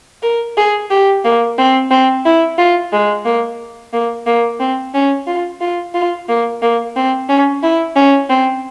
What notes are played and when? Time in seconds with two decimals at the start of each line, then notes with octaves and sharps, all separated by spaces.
0.22 A#4
0.57 G#4
0.90 G4
1.25 A#3
1.58 C4
1.91 C4
2.25 E4
2.58 F4
2.93 G#3
3.25 A#3
3.93 A#3
4.26 A#3
4.60 C4
4.94 C#4
5.27 F4
5.61 F4
5.94 F4
6.29 A#3
6.62 A#3
6.96 C4
7.29 C#4
7.63 E4
7.96 C#4
8.30 C4